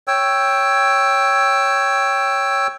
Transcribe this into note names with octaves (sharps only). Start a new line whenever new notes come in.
C#5 G5 E6